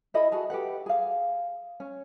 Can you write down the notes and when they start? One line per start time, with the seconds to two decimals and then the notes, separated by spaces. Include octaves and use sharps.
0.14 E4 A4 D#5 B5
0.32 F#4 G#4 A5
0.50 G4 A4 B4 F#5
0.86 G#4 F5
1.80 C#4